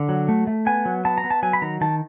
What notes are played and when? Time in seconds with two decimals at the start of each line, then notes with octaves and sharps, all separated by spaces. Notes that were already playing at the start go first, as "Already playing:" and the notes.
Already playing: D3
0.09 F#3
0.28 A3
0.47 A3
0.66 B3 G#5
0.85 F#3
1.05 B3 A5
1.18 A#5
1.24 B3
1.31 A5
1.43 F#3 G#5
1.53 B5
1.62 D#3 A#5
1.81 D#3 A5